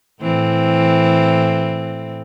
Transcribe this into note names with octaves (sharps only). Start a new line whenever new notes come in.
A2 E3 C4